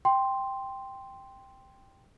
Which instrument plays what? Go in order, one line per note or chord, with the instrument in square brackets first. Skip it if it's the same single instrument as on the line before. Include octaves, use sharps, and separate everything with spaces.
[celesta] G5 C6